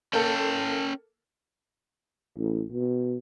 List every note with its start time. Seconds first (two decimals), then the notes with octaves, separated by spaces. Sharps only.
0.13 A#3 C#4 A4 G5
2.38 A1
2.72 B2